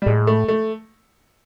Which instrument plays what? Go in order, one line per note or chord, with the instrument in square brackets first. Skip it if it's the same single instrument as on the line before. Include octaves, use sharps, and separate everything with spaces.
[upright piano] G3
[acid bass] A2 [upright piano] G#3
[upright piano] A3
A3